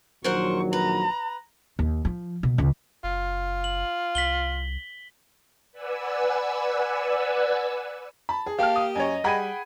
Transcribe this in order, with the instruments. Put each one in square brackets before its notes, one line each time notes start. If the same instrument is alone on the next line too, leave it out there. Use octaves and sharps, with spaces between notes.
[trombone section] A#1 D#3 F#3 [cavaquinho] A#4 C5 F#5 [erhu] C#6
[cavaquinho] B4 [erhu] A#5
[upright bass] D#2
F3
B2
C#2
[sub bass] F#1 [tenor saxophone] F4
[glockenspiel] F#7
[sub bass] C2 [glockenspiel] B6 F#7 G7
[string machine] B4 D5 F#5 G#5 E6
[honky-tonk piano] A5 [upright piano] B5
[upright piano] G#4
[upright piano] A#3 [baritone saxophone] G4 [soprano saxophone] F5 [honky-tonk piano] G5 A5 F6
[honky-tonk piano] D#6
[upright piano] F#2 [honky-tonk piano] C#5 G#5 [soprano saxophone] D#5
[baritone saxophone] G3 [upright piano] G#4 F#5 B5 [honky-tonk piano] G5 G#6 D#7